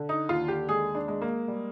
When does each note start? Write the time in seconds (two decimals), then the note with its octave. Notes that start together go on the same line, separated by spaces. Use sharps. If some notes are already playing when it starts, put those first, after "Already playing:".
Already playing: D3
0.09 D#4
0.29 D#2 F4
0.48 G4
0.69 G#3 G#4
0.95 D4
1.08 G#3
1.22 A#3
1.48 G3